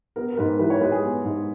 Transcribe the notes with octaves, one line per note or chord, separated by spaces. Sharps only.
B3 A#4
A#4
G#2 B4
E3 B4
C#5
G#3 B4
G#4
B3
G#2